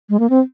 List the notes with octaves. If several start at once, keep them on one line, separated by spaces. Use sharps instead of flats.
G#3
A#3
C4